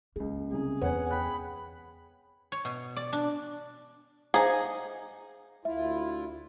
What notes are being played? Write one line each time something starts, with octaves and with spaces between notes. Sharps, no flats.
C#2 A#3 G#4
C2 C#3 G#4
E2 B4 C#5 F#5 G#5
G5 B5 F#6
C#5
B2
D5
D4
D#4 G#4 C5 F5 G#5 A#5
D2 E4 F4 E5